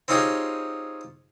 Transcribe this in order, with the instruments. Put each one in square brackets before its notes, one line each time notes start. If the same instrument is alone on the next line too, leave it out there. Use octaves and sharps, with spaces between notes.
[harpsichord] C4 C#4 D#4 F4 G4 G#4